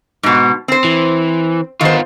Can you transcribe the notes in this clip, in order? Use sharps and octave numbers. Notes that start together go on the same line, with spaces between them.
G#2 B2
C4 C5
E3
D#3 B3 F4 C5